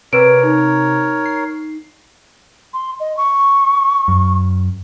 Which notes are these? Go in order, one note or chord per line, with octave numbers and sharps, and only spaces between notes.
C3 A#4 B4 C#5 D7
D#4
C7
C6
D#5
C#6
F#2